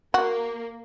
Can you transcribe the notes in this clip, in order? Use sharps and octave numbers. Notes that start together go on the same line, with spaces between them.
A#3 F#4